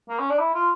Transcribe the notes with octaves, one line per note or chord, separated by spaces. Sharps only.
A#3
C#4
D4
E4
F4